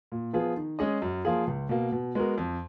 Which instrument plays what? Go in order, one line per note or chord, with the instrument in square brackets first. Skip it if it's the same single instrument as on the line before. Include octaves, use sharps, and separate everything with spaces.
[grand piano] A#2
F3 B3 F4 G#4
D#3
G#3 C#4 G#4 D#5
F#2
F3 A#3 F4 G#4
C#2
B2 A#3
B2
G#3 B3 F#4 A#4
F2